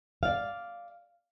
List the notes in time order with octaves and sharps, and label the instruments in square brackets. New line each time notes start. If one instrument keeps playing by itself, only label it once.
[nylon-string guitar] D5 F5